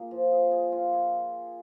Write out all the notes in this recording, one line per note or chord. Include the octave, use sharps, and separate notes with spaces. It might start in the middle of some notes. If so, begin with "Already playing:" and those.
Already playing: A#3 F4 G#4
F3
G#4
G#4
F4
G#4